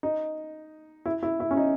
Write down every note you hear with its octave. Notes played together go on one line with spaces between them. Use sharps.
D#4
E4
E4
E4
C#4
D#4